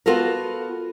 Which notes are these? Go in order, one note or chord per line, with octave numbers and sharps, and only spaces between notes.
B3 F4 F#4 A4 A#4